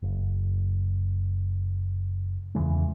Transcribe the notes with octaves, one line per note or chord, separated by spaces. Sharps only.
F#1
E2 C#3 E3 G#3